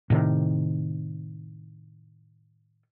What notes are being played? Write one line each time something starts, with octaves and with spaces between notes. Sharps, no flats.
A2 C3 D#3